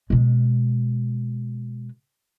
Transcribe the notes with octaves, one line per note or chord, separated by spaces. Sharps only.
B2 G#3